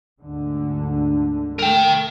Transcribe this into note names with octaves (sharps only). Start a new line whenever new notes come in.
D2 G#2 D3
A3 A#4 G5